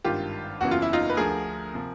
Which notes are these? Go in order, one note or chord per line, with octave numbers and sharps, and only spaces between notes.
G#1 G2 D#3 F4 G4
F#1 E2 C#3 E3 F#4
F4
E4
D#4 F4
B4
D2 D3 F3 G#4 A#4
C3 F3